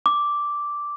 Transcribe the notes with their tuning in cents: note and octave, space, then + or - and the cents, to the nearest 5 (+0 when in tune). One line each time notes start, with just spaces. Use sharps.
D6 -5